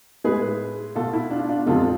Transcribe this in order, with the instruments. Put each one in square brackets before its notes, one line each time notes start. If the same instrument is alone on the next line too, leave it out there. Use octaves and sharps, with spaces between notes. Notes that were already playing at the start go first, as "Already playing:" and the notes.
[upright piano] A2 G#3 G#4 B4
B2 A3 F4 A4
E4
D4 F4
D4 F4
F2 C3 F3 G#3 F4 A4